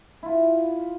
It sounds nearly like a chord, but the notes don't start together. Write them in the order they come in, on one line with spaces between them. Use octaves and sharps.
E4 F4 B4